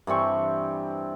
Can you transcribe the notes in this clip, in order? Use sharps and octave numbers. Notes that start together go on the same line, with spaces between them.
G2 E3 C4 C#6